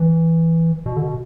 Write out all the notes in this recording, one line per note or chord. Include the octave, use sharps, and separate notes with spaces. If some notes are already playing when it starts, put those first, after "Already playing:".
Already playing: E3
B2
D3
B2